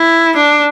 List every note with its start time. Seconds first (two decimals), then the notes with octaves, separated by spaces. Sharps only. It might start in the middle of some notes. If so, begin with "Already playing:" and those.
Already playing: E4
0.35 D4